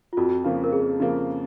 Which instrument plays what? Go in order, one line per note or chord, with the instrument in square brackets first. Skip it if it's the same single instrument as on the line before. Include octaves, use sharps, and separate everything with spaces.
[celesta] F4
[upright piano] F2 [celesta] F#4
[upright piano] C#3 F3 A#3
[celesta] A#4
[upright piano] F2 [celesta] G#4
[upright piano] C#3 F3 A#3